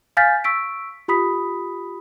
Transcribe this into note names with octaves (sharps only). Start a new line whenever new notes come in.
F5 G#5 F6 G6 A6 B6
C#6 E6 B6 D7
F4 G4 B5 D#6 B6